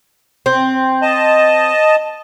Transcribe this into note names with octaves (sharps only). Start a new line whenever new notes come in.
C4
D#5 A5